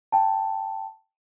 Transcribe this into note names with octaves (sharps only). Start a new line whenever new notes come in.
G5 A5